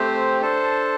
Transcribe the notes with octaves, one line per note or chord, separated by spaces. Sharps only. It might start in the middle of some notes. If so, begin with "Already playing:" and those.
Already playing: A3 C4 G4 C5
D4 A4 C5 A5